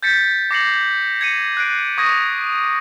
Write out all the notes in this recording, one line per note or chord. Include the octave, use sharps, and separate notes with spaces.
G6 A6 B6 C#7
D6 A#6 C7 C#7 F#7
G#6 C#7 D#7
F#6 C7 D7
C#6 D#6 G#6 A#6